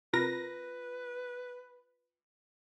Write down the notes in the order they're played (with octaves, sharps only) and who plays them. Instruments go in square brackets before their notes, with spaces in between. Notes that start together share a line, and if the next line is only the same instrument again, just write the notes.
[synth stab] C3 A#4 A#6 [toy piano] F4 [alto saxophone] B4